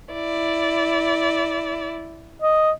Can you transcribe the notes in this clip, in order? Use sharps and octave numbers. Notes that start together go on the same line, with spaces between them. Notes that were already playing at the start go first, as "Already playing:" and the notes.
E4 D5
D#5